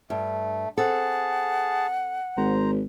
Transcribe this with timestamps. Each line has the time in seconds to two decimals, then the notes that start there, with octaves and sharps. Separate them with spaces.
0.10 G2 A3
0.78 C4 G#4 A4 F#5 A5
2.37 G#1 C5 A#5